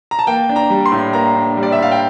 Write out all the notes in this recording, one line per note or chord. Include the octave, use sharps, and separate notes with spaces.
A#5
A5
A#3 G5
D4
A#5
G3
C6
A2
A#3 A#5
D4
G3
D5
E5
A2 F5
G5